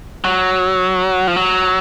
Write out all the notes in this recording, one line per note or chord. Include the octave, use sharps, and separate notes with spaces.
F#3
F3
F#3